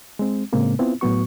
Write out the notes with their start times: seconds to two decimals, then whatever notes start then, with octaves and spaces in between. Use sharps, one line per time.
0.19 G#3 C4
0.52 A2 C#3 G#3 A#3 C4
0.79 B3 C4 E4 F4
1.01 A2 F#3 B3 F#4 C#6